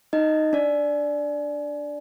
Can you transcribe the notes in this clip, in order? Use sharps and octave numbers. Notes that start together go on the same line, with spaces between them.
D#4 D#5
D4 D5